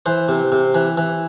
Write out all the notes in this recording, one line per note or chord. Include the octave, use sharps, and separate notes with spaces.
E3 C5
C3
C3
E3
E3